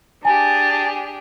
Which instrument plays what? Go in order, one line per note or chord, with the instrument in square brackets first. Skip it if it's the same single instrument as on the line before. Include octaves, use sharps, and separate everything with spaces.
[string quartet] D4 G4 G#4 [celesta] G#5 [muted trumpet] A5